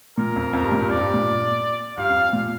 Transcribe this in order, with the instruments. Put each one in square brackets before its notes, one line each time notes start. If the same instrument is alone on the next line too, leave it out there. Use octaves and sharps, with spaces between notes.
[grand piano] A#2 [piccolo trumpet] A#4
[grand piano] F2
[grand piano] F2 [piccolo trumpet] A#4
[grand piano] G2
A#2
G2
[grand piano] F2 [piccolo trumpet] D5
[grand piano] G2
A#2
[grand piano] G2 [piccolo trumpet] F5
[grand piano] F2
A#2